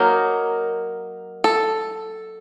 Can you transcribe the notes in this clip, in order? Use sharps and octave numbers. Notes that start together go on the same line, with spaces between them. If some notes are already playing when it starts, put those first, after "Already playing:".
Already playing: F#3 A#3 D#4 A#4
A4